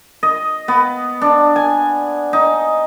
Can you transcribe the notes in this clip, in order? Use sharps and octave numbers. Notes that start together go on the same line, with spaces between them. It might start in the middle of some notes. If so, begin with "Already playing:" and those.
D#5
B3
D4
G#5
D#4